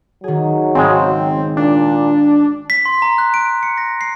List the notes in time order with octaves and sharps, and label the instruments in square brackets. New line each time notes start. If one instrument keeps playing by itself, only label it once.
[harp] D#3 G#4 [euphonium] F#3
[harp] G#1 [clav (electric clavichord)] C#3 G#3 [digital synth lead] C4
[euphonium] A#2 [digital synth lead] D4
[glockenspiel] B6
C6
A#5
F#6
D7
C#7
A#6
C7